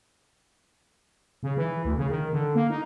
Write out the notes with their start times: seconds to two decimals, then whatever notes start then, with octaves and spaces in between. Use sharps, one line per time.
1.43 C#3
1.57 E3
1.85 D2
1.97 C#3
2.09 D#3
2.32 D3
2.55 A#3
2.70 D#4